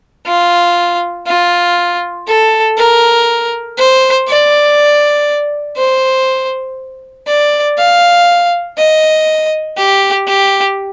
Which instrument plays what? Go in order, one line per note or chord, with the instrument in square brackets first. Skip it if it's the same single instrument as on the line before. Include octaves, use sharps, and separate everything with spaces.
[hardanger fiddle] F4
F4
A4
A#4
C5
D5
C5
D5
F5
D#5
G4
G4